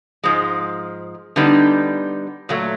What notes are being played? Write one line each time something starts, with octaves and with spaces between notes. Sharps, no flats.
G#2 F3 G#3
D3 G3 B3 D#4
A#2 F#3 A3